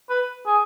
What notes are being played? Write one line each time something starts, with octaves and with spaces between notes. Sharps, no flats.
B4
G#4